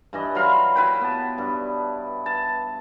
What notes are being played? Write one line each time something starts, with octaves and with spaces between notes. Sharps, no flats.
G2 E3 D#5
F#3 F5 B5 C6
E4 B4 G5
B3 A5
G2
A5